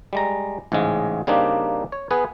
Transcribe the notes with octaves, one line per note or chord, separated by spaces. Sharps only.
G3 G#3 A#5
A1 G#2 C#3 G#3
C#3 G3 A#3 C4 D4 D#4
C#5
B3 G#4 B4